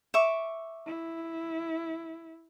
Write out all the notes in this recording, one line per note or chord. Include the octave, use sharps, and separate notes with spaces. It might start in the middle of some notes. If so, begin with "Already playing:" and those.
E5 C#6 D6
E4